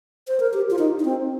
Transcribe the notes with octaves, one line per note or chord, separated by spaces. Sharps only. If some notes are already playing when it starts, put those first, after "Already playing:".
C5
A#4
G4
F4
D#4
D#4
C4